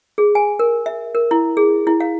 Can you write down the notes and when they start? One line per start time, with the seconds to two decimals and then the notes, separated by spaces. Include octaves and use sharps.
0.18 G#4
0.35 G#5
0.59 A#4
0.86 E5
1.15 A#4
1.31 E4
1.57 G#4
1.87 E4
2.00 F5